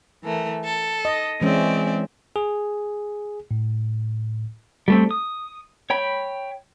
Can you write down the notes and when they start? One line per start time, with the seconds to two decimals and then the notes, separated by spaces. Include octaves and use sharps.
0.24 E3 A3 A#4
0.65 A4
1.05 D#5
1.41 E3 G#3 C4 C#4 D5 E5
2.36 G#4
3.51 A2
4.88 G3 A3 C4
5.11 D#6
5.90 C#5 G5 B5